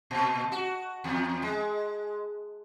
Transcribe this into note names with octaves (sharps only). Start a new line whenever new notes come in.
A#2
F#4
E2
G#3